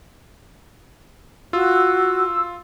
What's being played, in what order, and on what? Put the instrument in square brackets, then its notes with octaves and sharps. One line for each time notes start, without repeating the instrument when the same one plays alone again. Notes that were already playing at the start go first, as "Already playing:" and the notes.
[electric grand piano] F4 [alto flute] F#4 [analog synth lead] E6